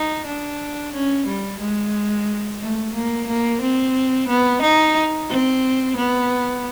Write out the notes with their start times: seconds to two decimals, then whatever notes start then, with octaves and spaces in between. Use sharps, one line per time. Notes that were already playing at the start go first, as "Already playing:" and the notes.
Already playing: D#4
0.26 D4
0.93 C#4
1.27 G3
1.60 G#3
2.61 A3
2.95 A#3
3.28 A#3
3.62 C4
4.29 B3
4.62 D#4
5.29 C4
5.97 B3